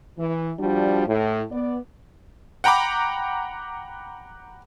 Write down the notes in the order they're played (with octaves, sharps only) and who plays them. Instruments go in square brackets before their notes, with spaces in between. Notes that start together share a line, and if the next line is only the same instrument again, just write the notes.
[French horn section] E3
F3 G3 D4 F#4
A2
B3 D5
[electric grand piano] F#5 G5 A#5 B5 D6